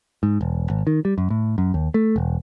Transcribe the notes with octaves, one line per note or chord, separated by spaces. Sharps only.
G#2
E1
G#1
D#3
G3
F#2
A2
F#2
D#2
A3
E1